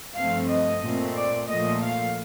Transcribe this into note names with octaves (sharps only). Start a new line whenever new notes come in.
G2 F3 A3 C4 F5
D#5
A#2 A3 C4
D5
A#2 F3 A3 D#5
F5